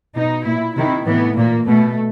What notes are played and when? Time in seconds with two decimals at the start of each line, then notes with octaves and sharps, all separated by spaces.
0.16 B2 D#4
0.45 A#2 E4
0.76 C3 D#3 E4
1.06 A2 E3 B3
1.37 A#2 A#3
1.67 B2 A3